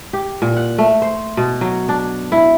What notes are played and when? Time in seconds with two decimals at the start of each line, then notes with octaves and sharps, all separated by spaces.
0.13 G4
0.42 A#2
0.56 F#5
0.78 A3
1.02 C5
1.37 B2
1.61 F#3
1.89 D4
2.32 E4